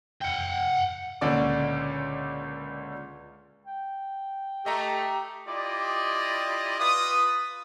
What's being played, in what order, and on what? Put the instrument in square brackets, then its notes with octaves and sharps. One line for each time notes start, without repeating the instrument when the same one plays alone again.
[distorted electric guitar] F#5 G5
[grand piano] C#2 A#2 D3 C#4 D5 D6
[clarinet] G5
[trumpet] A3 [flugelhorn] G4 [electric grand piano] D#5 A#5
[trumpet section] E4 F4 G4 D5 D#5
F4 B4 D#6